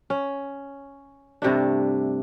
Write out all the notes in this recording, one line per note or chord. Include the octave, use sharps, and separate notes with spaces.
C#4
G2 C3 A3 D4